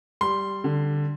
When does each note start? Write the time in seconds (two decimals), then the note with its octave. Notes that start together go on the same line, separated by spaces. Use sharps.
0.21 G3 C6
0.64 D3